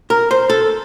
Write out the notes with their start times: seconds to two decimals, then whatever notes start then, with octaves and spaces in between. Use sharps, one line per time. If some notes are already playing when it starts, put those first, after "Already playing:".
0.10 A#4
0.31 C5
0.50 A4